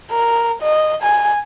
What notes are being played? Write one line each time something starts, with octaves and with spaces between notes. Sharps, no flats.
A#4
D#5
G#5